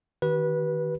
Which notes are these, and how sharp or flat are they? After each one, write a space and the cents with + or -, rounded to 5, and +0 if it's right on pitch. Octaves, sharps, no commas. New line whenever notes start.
D#3 +0 G4 -45 B4 -20